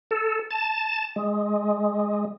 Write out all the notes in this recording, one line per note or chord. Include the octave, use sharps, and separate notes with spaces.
A4
A5
G#3